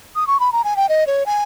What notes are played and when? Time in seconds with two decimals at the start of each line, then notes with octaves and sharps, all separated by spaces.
0.16 D#6
0.27 C#6
0.40 B5
0.52 A#5
0.64 G#5
0.77 G5
0.89 D#5
1.07 C#5
1.26 G#5